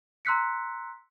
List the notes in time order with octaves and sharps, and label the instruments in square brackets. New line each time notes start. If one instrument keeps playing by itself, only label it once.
[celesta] A#5 C6 E6 F#6 B6 C#7